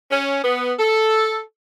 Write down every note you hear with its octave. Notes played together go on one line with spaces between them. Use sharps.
C#4
B3
A4